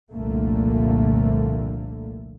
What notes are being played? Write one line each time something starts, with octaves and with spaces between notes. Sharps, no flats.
F1 C2 A#2 D3 A3 A#3